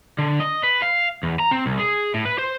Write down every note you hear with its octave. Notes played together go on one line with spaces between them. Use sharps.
D3
D#5
B4
F5
E2
A#5
C4
C2
G#4
A2
B4
C5